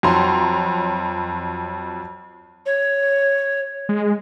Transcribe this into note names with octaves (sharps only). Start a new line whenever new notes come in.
F2 F#3 C#5 A#5 C6
C#5
G#3